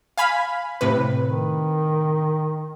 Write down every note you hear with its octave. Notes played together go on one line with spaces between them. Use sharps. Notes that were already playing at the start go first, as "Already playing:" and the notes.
F5 G#5 B5
A2 C3 B4
D#3